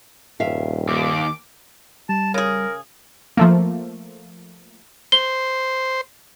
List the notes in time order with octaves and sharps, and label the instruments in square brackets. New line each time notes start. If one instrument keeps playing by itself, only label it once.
[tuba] D#1 [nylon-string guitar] G2 E5 F5
[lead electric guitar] D#2 [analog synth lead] D6
[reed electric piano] G3 [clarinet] A5
[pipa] C#3 G#4 [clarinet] A#4
[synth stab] F3 A3 A#3
[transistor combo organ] C5 [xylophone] G7